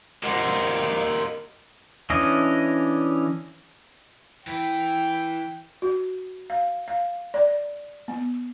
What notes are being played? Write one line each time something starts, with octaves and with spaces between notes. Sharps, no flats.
G4 A#4 C5 D#5 F#5
E3 C#4 D4 D#5
E3 G5
F#4
F5
F5
D5
B3